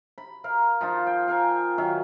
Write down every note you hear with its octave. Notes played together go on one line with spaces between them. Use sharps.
B5
A#4 F5 A#5
F3 D#4 F4
G5
A#4 F5 G5 G#5
D#3 F#3 E5 F5